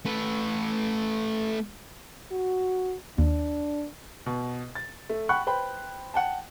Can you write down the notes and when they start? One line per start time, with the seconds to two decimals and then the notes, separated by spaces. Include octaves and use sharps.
0.05 A3 B4
2.32 F#4
3.18 D#2 D4
4.26 B2
4.75 A6
5.09 A3
5.29 F#5 G5 B5 C#6 F#6
5.47 B4 C5 G5 B5
6.14 F#5 G5 A5